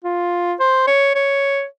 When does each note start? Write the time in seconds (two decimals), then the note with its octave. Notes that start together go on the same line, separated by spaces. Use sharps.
0.04 F4
0.60 C5
0.87 C#5
1.15 C#5